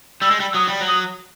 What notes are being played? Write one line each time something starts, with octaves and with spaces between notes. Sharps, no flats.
G3 E6
G#3
G3
E6
F#3 D#6
G3
F#3
D#6